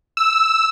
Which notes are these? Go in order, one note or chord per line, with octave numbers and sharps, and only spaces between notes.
E6